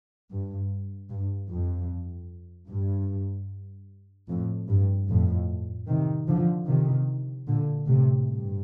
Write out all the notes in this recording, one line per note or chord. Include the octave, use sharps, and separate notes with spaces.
G2
G2
F2
G2
F2 A2
G2
F2 A2
C3 D#3
D3 F3
C3 D#3
A#2 D3
A2 C3
G2